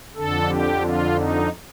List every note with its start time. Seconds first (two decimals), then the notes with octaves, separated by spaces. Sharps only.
0.16 F2 D3 A4
0.48 G4
0.82 F4
1.15 D#4